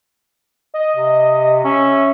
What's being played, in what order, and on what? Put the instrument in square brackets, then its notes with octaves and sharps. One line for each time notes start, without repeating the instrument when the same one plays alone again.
[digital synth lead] D#5
[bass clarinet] C3
[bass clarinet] C#4 [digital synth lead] E5